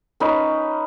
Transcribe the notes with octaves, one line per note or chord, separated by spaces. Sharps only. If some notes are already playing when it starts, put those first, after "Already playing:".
C#4 D#4 B4